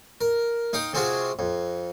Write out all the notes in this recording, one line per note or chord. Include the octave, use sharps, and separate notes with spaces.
A#4
D#4 F5 G5 D#6
C3 G#3 C4 F4 F#4 G#4
F2